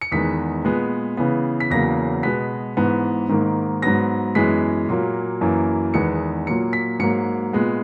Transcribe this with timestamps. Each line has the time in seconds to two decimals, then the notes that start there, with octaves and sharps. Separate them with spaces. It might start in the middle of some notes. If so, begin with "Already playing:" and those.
0.01 C#7
0.12 E2 D#3 G#3 B3 B6
0.65 A#2 G#3 B3
1.17 C#3 E3 B3
1.60 B6
1.70 E2 C#3 F#3 A#3 A#6
2.23 B2 G#3 B3 B6
2.77 G#2 E3 B3
3.29 G#2 D#3 A#3
3.82 G#2 F#3 B3 A#6
4.35 F#2 E3 G#3 B3 B6
4.89 A#2 F#3 A#3
5.41 F#2 E3 A#3
5.94 E2 D#3 G#3 B3 C#7
6.47 A#2 F#3 A#3 C#7
6.73 B6
6.99 G#2 F#3 A#3 C#7
7.53 A#2 G#3 B3